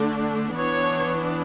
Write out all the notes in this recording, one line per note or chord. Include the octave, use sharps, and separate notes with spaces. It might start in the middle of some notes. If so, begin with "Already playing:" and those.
Already playing: D3 A3 D4
E3 B3 D4 C#5